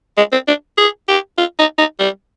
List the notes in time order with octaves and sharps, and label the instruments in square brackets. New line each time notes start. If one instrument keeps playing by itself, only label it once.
[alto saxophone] G#3
C4
D4
G#4
G4
F4
D#4
D#4
G3